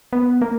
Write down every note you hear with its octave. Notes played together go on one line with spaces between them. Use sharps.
B3
A#3